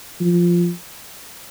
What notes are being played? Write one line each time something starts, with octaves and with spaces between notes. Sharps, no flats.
F3